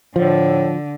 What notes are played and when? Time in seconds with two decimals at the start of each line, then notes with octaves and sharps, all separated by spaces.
0.16 A2 D3 F3